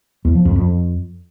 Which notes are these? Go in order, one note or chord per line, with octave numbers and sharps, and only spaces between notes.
E2
F3
F2
F2